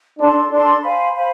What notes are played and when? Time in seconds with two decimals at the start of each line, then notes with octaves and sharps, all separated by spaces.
0.19 D4 A4 D5 A5 C6
0.51 D4 A4 D5 A5 C6
0.83 C5 F5 G#5 B5
1.15 C5 F5 G#5 B5